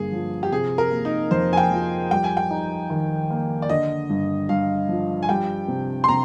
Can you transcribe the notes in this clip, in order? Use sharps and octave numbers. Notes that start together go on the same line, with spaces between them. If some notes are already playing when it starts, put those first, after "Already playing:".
Already playing: G2 D3 A#3 G#4
F3
G4
C3 G#4
A#4
A#3
D#4
F2 C5
G#5
G5
F3
G3 G5
G#5
G5
D#4
D#3
A#3
D5
D3 D#5
G2
G2 F5
F3
G#5
G3 G5
C3
C6
C3 A#5